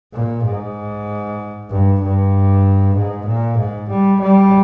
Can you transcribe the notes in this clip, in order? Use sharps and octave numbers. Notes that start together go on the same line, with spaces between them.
A#2
G#2
G2
G2
G#2
A#2
G#2
G3
G3